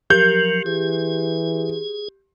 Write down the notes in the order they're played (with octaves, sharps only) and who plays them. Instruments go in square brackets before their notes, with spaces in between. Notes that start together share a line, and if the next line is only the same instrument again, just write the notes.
[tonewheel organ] F3 F#3 [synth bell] G4 [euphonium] A#4 [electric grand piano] G6
[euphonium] E3 [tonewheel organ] G#4